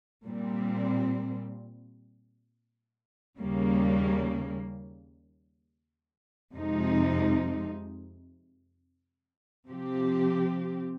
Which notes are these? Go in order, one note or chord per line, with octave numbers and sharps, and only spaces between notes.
A#2 G3 C4
D#2 C#3 G3 A#3
F2 C3 F3 G#3 D#4
C3 F3 C4 G4